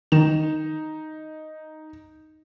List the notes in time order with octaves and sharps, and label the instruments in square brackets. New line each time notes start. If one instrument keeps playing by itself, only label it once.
[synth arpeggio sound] D#3 E7 [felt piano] D#4